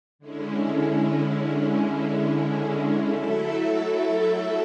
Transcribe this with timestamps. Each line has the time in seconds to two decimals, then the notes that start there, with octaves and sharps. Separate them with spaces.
0.19 D3 G#3 C#4 E4
3.11 F#3 A3 E4 A4 E5